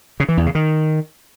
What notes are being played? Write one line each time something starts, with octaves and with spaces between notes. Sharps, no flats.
C#3
E3
E2
C#3
D#3